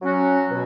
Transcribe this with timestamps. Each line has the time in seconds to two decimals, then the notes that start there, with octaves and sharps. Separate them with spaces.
0.01 F#3 C#4 F#4
0.50 B2